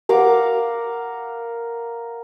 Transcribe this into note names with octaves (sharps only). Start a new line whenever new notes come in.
A#4 F5 F#5 D6